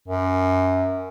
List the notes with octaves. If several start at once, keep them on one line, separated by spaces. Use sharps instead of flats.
F#2